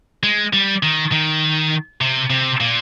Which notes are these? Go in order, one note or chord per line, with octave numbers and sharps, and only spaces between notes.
G#3
G3
D#3
D#3
C3
C3
A#2